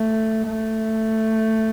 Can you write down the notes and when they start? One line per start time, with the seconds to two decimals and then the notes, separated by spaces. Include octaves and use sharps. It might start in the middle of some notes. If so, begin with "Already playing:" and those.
Already playing: A3
0.47 A3